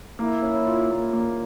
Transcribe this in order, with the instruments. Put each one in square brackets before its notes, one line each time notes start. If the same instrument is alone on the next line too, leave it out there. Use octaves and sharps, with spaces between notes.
[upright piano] A#3 [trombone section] E4
[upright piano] C#4
F4
A#3
A#3